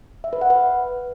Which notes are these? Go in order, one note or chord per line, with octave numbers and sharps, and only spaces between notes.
E5
B4
F#5
B4